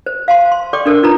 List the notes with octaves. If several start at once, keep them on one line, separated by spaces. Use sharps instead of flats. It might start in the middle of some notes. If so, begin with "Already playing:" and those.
C5
F5 A5 C6
C6
A4 D5 G5 C#6 D6
D4 A4 A#4 C5
D#4 F4 A4 B4 A#5